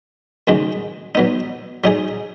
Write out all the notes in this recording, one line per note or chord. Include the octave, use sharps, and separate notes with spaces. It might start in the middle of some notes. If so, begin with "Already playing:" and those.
D#2 C#3 F#3 D#4
F#3 B3 D#4
F#3 D#4 G#4